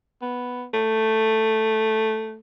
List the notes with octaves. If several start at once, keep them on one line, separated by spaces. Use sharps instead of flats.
B3
A3